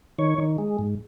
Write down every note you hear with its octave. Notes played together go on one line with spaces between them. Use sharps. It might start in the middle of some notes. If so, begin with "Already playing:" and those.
D#3 C#5
D#3
G#3
G#2